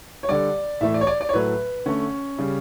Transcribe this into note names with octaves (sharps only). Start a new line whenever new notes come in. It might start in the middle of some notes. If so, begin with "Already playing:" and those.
C#5
D3 G3 D5
A2 E3 A3 E5
D5
C#5
D5
D5
C#5
A2 F#3 A3 B4
D3 A3 C#4
C#3 G3